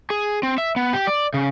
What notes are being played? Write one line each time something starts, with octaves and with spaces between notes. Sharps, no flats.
G#4
C4
E5
B3
G4
D5
C#3